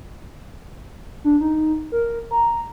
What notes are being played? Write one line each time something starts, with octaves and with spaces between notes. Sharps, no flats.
D4
D#4
A#4
A#5